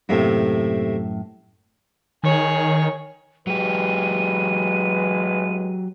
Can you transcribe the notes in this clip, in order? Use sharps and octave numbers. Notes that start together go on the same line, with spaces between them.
F#2 A2 C3 A3 A#3
D#3 G#4 C#5
A1 F#3 G#3 G4 B4 D#7